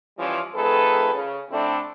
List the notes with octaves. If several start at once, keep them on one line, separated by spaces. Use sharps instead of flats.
E3 F3 G3 C#4
F2 D#3 A3 G#4 A4 B4
C#3
D3 A3 C4 D4 E4